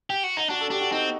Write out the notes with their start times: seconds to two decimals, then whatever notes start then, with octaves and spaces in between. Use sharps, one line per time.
0.10 G4
0.24 F#4
0.37 D#4
0.49 D4 F#4
0.61 A4
0.70 D4 G4
0.81 F#4
0.92 C4 D#4